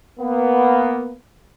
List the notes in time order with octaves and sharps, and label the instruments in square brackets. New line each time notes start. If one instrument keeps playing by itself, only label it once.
[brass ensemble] A#3 B3